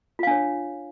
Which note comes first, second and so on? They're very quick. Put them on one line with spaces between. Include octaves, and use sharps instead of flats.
F4 F5 D4 C#5